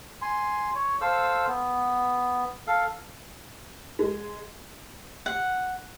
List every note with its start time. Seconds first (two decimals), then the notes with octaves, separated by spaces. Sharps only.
0.22 G#5 C6
0.75 C#5
1.01 A4 C5 F5 E6
1.47 B3
2.67 A4 F5
3.99 G#3
5.26 F#5